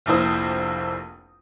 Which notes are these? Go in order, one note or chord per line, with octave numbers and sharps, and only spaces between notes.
F1 A#1 A#3 E4 C5 D#6